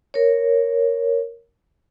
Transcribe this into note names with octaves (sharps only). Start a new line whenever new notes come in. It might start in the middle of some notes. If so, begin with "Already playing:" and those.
A#4 C#5